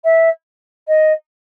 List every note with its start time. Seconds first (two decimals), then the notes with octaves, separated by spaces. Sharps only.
0.04 E5
0.87 D#5